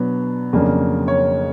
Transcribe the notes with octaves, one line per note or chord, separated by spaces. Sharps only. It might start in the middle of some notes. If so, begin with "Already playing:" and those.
Already playing: B2 F#3 B3 D4
F2 C#3 F#3 A#3 D4
C#5